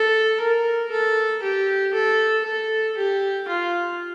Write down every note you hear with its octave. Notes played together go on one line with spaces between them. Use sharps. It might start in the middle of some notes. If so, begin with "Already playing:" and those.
Already playing: A4
A#4
A4
G4
A4
A4
G4
F4